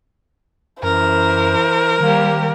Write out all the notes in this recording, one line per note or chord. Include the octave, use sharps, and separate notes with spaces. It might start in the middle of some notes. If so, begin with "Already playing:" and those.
F#2 E3 A#4 C5
D#3 G3 A#3 G4